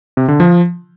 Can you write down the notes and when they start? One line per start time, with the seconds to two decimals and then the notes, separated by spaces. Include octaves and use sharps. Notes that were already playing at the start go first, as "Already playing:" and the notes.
0.17 C3
0.28 D3
0.40 F3